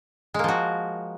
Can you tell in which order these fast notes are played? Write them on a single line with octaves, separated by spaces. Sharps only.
G#3 A#3 F3 F#4